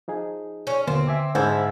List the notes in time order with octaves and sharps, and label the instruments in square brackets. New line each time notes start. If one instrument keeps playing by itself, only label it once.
[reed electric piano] F3 D#4 G#4
[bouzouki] C#4
[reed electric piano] D#2 B2 A#3 [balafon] D3 [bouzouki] C4
[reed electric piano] E5 G#5 D6
[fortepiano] G#2 [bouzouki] F3 E4